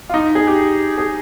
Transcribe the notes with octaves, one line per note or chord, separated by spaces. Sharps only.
F4
D#4
G#4
G4
G#4